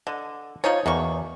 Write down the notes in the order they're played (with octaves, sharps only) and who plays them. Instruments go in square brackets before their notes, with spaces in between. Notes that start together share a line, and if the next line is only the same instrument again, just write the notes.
[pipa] D3 [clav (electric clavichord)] D#5
[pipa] F3 D#4 C#5 [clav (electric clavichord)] F5
[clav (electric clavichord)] E2 [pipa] B2 A#3 C#6